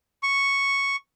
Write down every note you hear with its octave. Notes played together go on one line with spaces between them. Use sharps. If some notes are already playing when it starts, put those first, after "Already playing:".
C#6